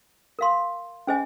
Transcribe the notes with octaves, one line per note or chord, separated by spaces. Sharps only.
A#4 F5 C6
C#4 G#4 C5 D#5 G#5